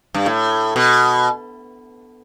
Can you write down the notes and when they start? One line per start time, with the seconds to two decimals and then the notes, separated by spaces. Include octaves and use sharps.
0.14 G2
0.26 A2
0.76 B2